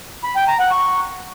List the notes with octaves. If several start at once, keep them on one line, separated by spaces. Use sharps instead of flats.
B5
G5
A#5
F#5
C#6